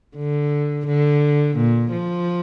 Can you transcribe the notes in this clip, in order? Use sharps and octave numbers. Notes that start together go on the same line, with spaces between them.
D3
D3
A#2
F3